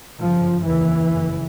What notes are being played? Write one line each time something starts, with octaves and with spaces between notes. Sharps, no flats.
G1 F#2 C#3 F3
F1 D#2 C#3 E3
F#1 F2 C#3